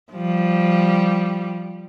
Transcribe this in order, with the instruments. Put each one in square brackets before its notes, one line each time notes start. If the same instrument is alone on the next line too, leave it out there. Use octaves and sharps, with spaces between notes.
[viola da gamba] F3 G3